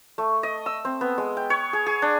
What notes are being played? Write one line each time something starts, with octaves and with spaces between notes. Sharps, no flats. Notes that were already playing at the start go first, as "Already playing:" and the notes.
A3
D#5
E6
C4
B3
G#3
G5
C#5
G#4
G#4
D4